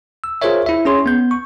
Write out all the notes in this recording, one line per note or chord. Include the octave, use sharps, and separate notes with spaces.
E6
F4 G#4 A#4 C5 C#5 E5
E4 E5
C#4 G#4 C#5 C6
B3 G6
C#6